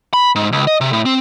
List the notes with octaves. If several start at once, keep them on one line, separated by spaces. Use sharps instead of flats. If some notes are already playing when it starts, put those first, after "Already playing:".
B5
G#2
C#2
D#5
C3
A2
C4